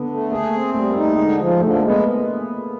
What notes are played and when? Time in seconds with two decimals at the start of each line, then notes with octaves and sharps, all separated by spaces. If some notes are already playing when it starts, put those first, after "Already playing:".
Already playing: D3 B3
0.09 A3
0.30 A#3 G#4
0.53 C4
0.74 G3 A3
0.90 A#3
0.96 A3 D#4
1.17 D3 G#3
1.39 F3
1.61 D3 A3
1.75 A#3
1.82 G#3
1.89 B3